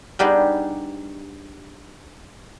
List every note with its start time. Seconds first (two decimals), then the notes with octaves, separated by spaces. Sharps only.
0.19 G3 B3 D4 D#4 G4 G#4